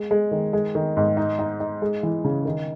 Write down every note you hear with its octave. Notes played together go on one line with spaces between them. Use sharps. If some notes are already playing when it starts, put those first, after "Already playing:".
Already playing: G#3
G#3
D#3
G#3
D#3
G#2
D#4
D#4
D#4
G#3
E3
C#3
D#3